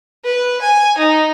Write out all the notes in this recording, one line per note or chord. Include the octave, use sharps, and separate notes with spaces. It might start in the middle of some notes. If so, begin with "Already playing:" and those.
B4
G#5
D#4